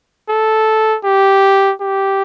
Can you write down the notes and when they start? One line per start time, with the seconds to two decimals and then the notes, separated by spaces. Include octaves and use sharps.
0.29 A4
1.04 G4
1.81 G4